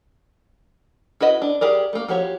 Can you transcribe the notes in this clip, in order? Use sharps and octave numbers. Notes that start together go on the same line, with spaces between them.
E4 F#4 B4 D#5
D4
G4 G#4 A#4 D5
A3 A#3
F3 F#4 G4 C#5